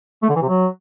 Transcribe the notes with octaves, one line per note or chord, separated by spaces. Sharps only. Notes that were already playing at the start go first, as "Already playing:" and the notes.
A3
D3
E3
C3
F#3